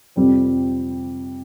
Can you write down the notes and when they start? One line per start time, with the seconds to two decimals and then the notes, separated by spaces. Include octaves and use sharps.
0.16 F2 C3 G3 C4